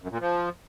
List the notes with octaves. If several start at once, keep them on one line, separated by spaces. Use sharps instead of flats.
F#2
A#2
F3